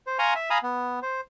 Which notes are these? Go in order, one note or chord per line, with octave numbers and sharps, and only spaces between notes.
C5
F5 G#5 A#5 C6 C#6
E5
F5 G#5 A#5 B5 D#6
B3
C5